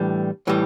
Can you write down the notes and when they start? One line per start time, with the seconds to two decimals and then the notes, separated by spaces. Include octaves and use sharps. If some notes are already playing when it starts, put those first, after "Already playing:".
Already playing: A2 E3 G3 D4
0.47 A2 E3 G3